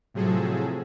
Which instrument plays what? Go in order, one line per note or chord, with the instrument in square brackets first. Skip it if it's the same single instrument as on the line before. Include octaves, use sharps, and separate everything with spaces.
[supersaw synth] A2 C3 F3 F#3 G#4 A4